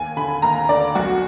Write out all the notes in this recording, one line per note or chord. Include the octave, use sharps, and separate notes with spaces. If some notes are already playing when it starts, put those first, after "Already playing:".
Already playing: D#2 G#5
D3 B5
D#2 A#5
D3 D5
B1 F#4